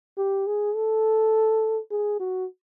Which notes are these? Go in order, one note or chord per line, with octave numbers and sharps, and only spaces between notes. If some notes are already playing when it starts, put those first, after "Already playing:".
G4
G#4
A4
G#4
F#4